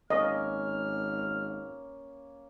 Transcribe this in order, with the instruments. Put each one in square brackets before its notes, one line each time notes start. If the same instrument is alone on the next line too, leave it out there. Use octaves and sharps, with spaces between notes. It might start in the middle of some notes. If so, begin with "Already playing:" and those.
[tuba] G#1 [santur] A#3 C#4 [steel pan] D#5 [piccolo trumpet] F6